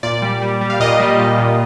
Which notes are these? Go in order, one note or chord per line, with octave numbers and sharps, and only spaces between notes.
A#2 D5
G3
G3
G3
F5
A#2 D#5
G3
A#2
A#2